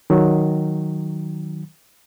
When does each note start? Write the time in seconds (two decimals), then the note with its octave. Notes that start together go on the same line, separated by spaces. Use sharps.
0.10 D#3 F#3